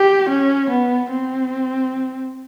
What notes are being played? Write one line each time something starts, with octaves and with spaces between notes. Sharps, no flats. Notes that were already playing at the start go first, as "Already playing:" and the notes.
Already playing: G4
C#4
B3
C4